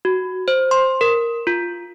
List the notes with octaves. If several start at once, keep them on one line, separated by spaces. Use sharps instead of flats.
F#4
C5
C6
A#4
F4